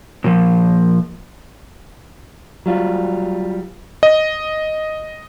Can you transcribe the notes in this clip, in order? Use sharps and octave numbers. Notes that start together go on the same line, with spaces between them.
A#2 F3
F#3 G3 F4
D#5